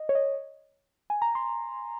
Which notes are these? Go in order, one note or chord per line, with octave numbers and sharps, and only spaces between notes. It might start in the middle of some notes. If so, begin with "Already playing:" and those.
Already playing: D#5
C#5
D#5
G#5
A#5
C6